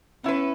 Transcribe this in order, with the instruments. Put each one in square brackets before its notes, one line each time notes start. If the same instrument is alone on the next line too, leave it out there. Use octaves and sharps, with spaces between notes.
[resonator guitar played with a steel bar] B3 E4 B4 [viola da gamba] C#4